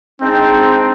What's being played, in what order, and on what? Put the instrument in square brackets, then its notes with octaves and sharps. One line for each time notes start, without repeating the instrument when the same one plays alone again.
[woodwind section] G#3 D4 D#4 [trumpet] C4